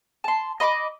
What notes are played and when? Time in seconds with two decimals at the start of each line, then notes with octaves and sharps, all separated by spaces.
0.24 A5 C6
0.60 D#5 B5 C6 D6